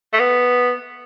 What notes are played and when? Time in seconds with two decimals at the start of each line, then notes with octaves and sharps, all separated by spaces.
0.13 A3
0.19 B3